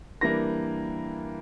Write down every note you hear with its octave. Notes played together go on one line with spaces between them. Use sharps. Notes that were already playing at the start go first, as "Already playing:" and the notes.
E3 G3 A#3 D4 A#6